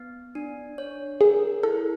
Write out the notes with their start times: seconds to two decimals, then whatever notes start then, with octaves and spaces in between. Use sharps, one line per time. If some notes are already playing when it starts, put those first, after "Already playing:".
Already playing: B3
0.35 D4
0.78 C#5
1.20 G#4 A#4
1.63 E4 A4